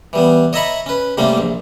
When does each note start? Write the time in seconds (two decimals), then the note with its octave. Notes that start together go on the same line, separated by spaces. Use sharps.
0.13 E3 G3 B3
0.53 C#5 D#5 E5 A#5 B5 C#6
0.86 C#4 B4
1.18 C3 G3 A3 A#3 C#4
1.38 A#1